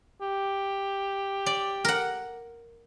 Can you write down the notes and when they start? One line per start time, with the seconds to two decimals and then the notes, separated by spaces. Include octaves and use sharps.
0.21 G4
1.46 D5
1.85 A#4 F#5